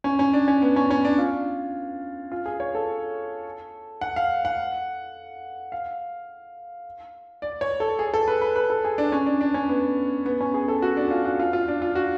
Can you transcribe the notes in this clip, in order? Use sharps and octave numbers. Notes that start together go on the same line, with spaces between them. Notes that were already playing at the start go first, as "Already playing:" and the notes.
C#4
C#4
D4
C#4
B3
C#4
C#4
D4
F4
F4
G#4
C#5
A4
F#5
F5
F#5
F5
D5
C#5
A4
G#4
A4
B4
B4
B4
A4
G#4
D4
C#4
D4
D4
C#4
B3
B3
C#4
G#4
A4
F#4
D4
F4
F#4
F4
F4
D4
F4
F#4